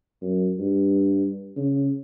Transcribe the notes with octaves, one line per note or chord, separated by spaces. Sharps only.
F#2
G2
C#3